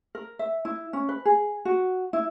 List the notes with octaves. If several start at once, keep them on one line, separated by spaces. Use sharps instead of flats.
A#4
E5
E4
C#4
B4
G#4
F#4
E4